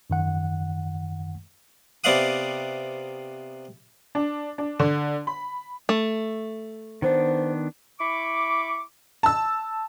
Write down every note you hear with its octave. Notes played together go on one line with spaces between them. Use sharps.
F#2 D#3 F#5
C3 B3 D5 F5 F#5 D#6
D4
D4
D3
B5
A3
D#3 B3 D4 C5
E4 B5 C#6 D6
A5 E6